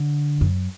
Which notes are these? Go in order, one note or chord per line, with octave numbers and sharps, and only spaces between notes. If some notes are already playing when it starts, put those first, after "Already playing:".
Already playing: D3
F#2